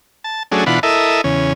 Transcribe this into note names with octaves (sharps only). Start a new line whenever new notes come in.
A5
F#3 A3 C#4 D4 G#4
B2 E3 D4 F4 F#5 B5
E4 A4 A#4 D#5 E5
E2 C#3 C#4